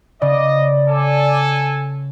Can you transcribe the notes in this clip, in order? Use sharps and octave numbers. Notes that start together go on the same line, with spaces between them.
C#3 D5 D#5
A4 G#5